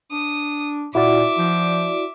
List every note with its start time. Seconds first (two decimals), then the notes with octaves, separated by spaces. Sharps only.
0.12 D4 D#6
0.95 A#2 E4 F#4 D5 E5 D6
1.39 F3